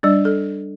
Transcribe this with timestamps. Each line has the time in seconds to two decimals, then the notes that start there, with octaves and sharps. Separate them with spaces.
0.03 G3 D4 D5
0.25 A4